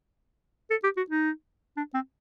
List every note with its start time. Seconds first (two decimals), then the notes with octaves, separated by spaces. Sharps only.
0.70 A4
0.83 G4
0.97 F#4
1.10 D#4
1.77 D4
1.94 C4